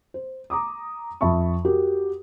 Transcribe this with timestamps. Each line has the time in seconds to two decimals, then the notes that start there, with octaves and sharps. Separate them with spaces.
0.14 C5
0.50 A#5 D6 D#6
1.21 F2 E5 A5 B5 C#6
1.65 F#4 G4 A#4